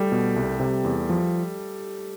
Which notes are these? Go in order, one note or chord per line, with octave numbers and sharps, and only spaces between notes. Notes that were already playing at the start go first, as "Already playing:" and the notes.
Already playing: G3 A3
B2
C2
C3
E2
F3